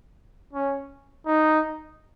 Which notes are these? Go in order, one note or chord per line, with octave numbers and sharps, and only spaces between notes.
C#4
D#4